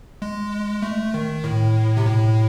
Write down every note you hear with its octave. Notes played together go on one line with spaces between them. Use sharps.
G#3
A3
D#3
A2
C3
A2